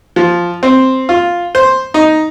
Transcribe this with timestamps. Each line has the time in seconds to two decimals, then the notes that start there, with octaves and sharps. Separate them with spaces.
0.16 F3
0.63 C4
1.09 F4
1.55 C5
1.94 D#4